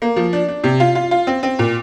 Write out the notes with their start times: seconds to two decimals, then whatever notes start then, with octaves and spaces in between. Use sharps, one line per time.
0.02 A#3
0.16 F3
0.33 D4
0.48 D4
0.64 C3
0.80 F4
0.95 F4
1.11 F4
1.27 C4
1.43 C4
1.59 A#2